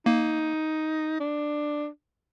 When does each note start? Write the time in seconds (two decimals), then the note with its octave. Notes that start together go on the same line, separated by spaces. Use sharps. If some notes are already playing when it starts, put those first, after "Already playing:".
0.06 A#3 D#4
1.20 D4